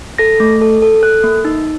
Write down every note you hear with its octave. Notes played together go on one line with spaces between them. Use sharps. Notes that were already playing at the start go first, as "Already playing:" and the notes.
A4 A#6
A3
A4
A4
A4 F#6
A#3
D#4